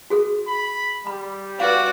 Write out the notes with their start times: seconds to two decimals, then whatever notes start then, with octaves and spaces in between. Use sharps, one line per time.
0.10 F#4 G#4 A4
0.48 B5
1.07 G3 B5
1.60 F#4 B4 D5 F5